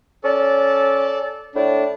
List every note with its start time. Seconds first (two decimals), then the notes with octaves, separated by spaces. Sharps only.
0.24 C#4 A4 D5
1.55 A2 D4